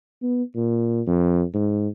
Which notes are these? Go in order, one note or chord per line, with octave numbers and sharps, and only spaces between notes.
B3
A#2
F2
G#2